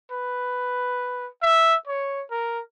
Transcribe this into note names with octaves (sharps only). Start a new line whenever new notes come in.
B4
E5
C#5
A#4